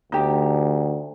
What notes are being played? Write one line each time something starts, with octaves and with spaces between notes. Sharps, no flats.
D2 D#4 G4